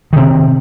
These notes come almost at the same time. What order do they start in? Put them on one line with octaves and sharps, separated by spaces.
D#3 C3 C4